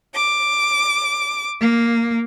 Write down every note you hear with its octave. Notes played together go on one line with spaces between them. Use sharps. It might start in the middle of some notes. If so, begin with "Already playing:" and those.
D6
A#3